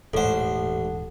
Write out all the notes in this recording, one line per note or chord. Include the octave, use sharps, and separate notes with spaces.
D#1 A1 G#2 A4 C5 F#5